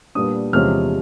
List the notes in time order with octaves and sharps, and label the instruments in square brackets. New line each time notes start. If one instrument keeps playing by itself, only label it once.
[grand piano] A#2 G3 B3 D4 D#6
E2 C3 F3 G#3 C#4 F6